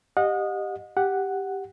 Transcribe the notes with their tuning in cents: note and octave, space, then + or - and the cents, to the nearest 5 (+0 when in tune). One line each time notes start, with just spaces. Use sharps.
G4 +0 D#5 -15 F#5 -40
G4 +0 F#5 +0